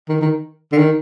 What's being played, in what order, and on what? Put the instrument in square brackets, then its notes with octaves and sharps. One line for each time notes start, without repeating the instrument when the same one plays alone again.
[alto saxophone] D#3
D#3
D3
D#3